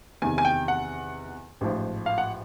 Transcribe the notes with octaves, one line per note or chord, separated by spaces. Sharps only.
E2 C3 D#3 G#5
G#5
G5
F#5
A1 G#2 F3
F5
F#5